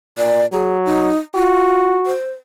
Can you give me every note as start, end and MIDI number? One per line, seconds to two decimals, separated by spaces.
0.18 0.44 46
0.18 0.46 74
0.53 1.10 54
0.53 0.77 68
0.85 1.16 63
1.35 1.93 65
1.35 2.14 66
2.06 2.31 72